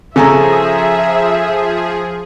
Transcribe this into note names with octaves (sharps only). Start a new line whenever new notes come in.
C#3 F3 G#4 A4 E5 G#5 A#5